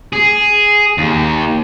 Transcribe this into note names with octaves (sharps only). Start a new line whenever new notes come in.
G#4
D#2